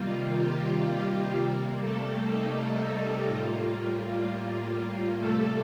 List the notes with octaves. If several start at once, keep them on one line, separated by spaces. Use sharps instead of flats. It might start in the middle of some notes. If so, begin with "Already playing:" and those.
Already playing: C3 D#3 G3 A#3 F4
G3 G4
C3 G3 A#3
A3 A4
D#4
A2 G3 A#3 F4
F4
C3 G3 A3 A#3 A4